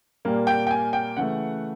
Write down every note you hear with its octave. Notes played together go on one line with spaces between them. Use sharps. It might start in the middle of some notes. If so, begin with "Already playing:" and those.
A#2 G3 A#3
G5
G5
G#5
G5
C#3 E3 A3 F#5